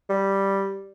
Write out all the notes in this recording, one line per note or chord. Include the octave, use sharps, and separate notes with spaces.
G3